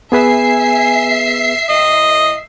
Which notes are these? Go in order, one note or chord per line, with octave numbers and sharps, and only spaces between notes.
B3 G#4 B4 E5 G#5 C7
A2 D#5